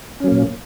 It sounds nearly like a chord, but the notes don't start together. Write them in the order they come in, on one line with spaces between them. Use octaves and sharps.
C#4 F#3 A#3 A#2